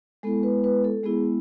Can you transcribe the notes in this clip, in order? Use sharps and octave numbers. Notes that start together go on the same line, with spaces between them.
G#3 B3 E4 A4
B4
B4
A4
G#3 B3 E4 G#4